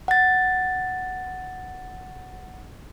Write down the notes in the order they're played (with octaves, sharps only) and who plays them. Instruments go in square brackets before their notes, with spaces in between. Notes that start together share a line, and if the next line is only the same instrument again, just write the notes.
[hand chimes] F#5 A6